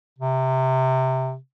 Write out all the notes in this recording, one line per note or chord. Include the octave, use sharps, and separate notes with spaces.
C3